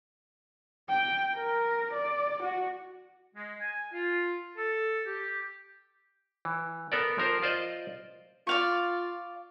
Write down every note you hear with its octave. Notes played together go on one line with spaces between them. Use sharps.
G5
A#4
D5
F#4
G#3
G#5
F4
A4
G4
E3
B3 A4 A#4 D5
F3 A#4 C5
F4 C5 D5 D#5
F4 D5 F5 C#6